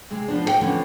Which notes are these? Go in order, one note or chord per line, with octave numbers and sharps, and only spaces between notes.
C3 G#3
F3 B3 D4
G4 G#4 G5
D3 E3 F3 B3 C#4